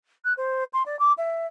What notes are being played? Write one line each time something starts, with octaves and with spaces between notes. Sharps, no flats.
F#6
C5
C6
D5
D6
E5